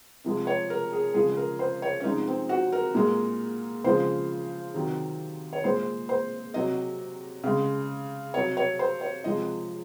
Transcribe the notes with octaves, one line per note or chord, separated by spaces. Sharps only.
C3 F3 G#3
C#5
A#4
G#4
C#3 F3 G#3 G#4
A#4
C5
C#5
C#4
C3 F3 G#3 D#4
C4
F#4
A#4
A#2 G#3
C#3 F3 G#3 C5
C3 D#3 F#3
C#5
A#2 G#3 C5
C5
C3 F#3 D#5
C#3 G#3
C3 F#3 C#5
C#5
C5
C#5
C3 F3 G#3 D#5